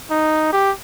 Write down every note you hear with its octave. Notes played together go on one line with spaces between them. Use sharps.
D#4
G4